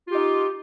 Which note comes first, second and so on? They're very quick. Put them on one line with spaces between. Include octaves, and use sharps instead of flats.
F4 G4 D#4